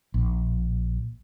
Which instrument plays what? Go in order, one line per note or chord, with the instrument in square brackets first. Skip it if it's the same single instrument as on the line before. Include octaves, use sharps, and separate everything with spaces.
[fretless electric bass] A#1